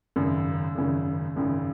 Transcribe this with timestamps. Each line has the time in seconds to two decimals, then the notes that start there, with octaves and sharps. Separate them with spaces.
0.16 G#1 F#2 C#3
0.75 G#1 F#2 C#3
1.36 G#1 F#2 C#3